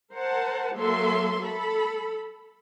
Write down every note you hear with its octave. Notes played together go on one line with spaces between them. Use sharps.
A#4 C5 F#5 A5
F#3 A#3 A4 E5 C6
A4 B5